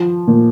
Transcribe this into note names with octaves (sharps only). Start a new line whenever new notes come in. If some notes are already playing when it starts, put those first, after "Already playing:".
Already playing: F3
A#2